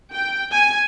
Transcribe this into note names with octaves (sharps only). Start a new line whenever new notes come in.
G5
G#5